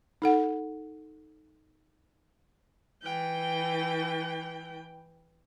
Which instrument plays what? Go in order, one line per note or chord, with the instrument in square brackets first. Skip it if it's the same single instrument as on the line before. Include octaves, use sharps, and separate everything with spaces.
[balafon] D#4 A4 F#5
[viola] E3 G5